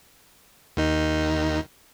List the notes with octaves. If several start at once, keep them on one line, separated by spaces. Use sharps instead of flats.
D#2 D#3 D#4